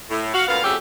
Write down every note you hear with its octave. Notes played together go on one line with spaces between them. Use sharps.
A2
F#4 F5
D2 A#2 B3 F5
F2 C#3 F#3 A3 G4 E5